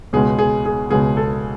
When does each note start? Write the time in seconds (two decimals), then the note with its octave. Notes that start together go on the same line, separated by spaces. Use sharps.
0.13 C#2 B2 G#3 G#4
0.39 G#4
0.65 G#4
0.91 C#2 B2 G#3 G#4
1.17 A4